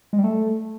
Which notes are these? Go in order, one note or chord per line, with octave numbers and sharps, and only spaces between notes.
G#3
G3
A3